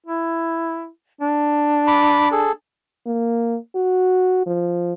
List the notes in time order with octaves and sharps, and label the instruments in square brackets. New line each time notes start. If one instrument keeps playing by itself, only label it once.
[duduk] E4
D4
[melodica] B5 D6
G#4 A4
[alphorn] A#3
F#4
F3